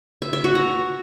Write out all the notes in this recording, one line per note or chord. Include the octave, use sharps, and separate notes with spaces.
E5
E5
F#4
A#5